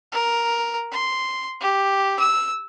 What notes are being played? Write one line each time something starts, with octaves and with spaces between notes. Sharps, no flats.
A#4
C6
G4
E6